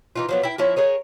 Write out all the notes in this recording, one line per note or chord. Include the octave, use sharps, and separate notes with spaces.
E3 D#4 F4
F3 F#3 B3
E4 G5
F3 C4 E4 C#5
G#4 A#4 C#5 D#5